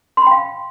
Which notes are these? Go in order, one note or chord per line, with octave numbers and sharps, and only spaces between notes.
F5 G5 B5 C6